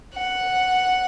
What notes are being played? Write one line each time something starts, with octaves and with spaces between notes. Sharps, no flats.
F#5